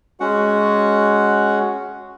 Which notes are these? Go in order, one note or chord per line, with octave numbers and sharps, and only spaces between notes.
G#3 C#4 F#4 F#5